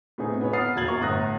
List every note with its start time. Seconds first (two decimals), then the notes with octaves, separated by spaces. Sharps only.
0.18 A2 C3 B3 D#4 G#4
0.41 B3 D#4 G#4 B4 C#5
0.53 F#5 B5 D#6 F6 A6 C7
0.76 E1 A#3 F#4 G#6 A6 F#7
0.88 E4 A#5 C#6
1.01 G1 A2 A#5 D#6 F#6 A#6